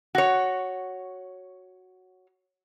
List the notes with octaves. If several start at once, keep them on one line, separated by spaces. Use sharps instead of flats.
F#4 C#5